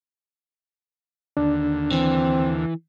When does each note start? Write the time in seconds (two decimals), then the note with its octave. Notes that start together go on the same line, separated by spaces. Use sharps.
1.37 D#2 D3 D4
1.92 E3 C4